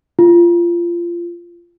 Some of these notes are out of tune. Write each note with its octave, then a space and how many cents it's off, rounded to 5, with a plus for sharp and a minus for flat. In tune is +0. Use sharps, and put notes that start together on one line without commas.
F4 -20